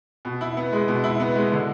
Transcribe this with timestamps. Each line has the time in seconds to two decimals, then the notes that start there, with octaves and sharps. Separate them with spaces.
0.25 B2
0.41 E4
0.57 B3
0.73 G#3
0.88 B2
1.04 E4
1.20 B3
1.35 G#3
1.52 D3